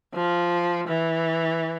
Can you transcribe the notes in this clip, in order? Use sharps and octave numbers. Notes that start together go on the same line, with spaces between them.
F3
E3